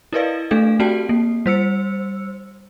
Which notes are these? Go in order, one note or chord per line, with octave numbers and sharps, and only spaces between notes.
E4 A#4 B4 D5 D#5 F5
A3 D4 A4 F5
C4 F#4 G4 D5 G5 A5
A#3
G3 C5 E6 C#7